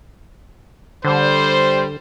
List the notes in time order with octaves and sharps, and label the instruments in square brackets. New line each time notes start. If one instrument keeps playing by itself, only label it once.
[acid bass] D3 [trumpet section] G3 C5